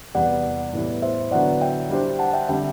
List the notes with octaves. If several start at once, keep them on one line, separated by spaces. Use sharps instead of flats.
E2 C3 G3 B3 D5 F#5
A2 E3 G3 B3 E4
C5 E5
D3 F#3 B3 E4 D5 F#5
E5 G5
G3 D4 G4 C5
F#5 A5
E5 G5
D3 G3 C4 E5 G5